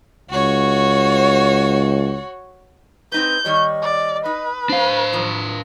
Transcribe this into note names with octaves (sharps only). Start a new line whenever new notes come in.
C#2 F#4 C#5
C4 D#4 B4 G6
D#3 G3 C#5 D#5
D5
D#4 B4
D4 C5 F5
D#3 F3